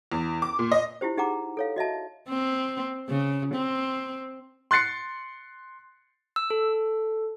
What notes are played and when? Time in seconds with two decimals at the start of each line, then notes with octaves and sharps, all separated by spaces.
0.12 E2
0.42 D6
0.59 A#2
0.71 D#5
1.01 E4 F4 G4 C5
1.17 D#4 G4 G#4 F#5 A#5 D6
1.57 A4 C#5 F5
1.76 F#4 D#5 E5 A5
2.29 C4
3.09 C#3
3.55 C4
4.71 C6 F#6 A6 C7 C#7
6.36 E6
6.50 A4